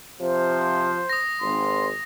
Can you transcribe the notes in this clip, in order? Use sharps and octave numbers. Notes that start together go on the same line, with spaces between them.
C3 F3 C5
D#6 A#6
G#1 C6